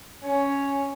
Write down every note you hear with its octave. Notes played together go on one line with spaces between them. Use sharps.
C#4